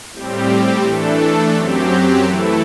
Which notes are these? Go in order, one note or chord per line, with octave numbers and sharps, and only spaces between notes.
A2 G3 C4 G4
E3 A3 D4 A4
F#2 F#3 C4 G4
E3 A3 E4 A4